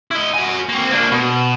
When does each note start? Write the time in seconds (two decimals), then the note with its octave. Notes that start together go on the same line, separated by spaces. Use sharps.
0.11 E4 D#5
0.34 F#4 G#5
0.69 A#3 C4
0.91 A#3 D4
1.12 B2